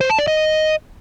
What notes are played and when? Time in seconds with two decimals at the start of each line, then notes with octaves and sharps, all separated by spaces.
0.01 C5
0.10 A5
0.19 D5
0.27 D#5